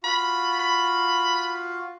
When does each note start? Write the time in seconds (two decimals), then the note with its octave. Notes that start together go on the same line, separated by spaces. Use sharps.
0.04 F4 F#4 B5
0.59 B5